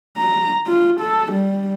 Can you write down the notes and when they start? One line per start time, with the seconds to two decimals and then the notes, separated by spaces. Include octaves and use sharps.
0.17 A#5
0.67 F4
1.00 A4
1.33 G3